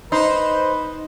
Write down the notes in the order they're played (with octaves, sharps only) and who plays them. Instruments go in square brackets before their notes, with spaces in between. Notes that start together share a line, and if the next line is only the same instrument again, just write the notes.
[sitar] D#4 [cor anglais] B4 [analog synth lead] C5